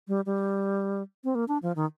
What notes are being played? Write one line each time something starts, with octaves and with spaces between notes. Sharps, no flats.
G3
G3
C4
A#3
D4
F3
D#3